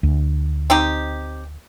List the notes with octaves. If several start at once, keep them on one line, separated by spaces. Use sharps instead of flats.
D2
C4 D#4 G4